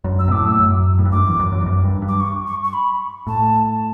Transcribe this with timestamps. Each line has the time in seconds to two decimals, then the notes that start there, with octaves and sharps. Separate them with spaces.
0.04 F#2
0.19 E6
0.28 B2
0.32 A2 D6
0.46 E6
0.59 F#2
0.98 A2
1.05 G2
1.12 F#2 D6
1.26 E2
1.39 F#2
1.52 F#2
1.61 E2
1.66 F#2
1.84 G2
2.02 G2
2.08 D6
2.20 C#6
2.47 C#6
2.64 C#6
2.73 B5
3.27 A2 A5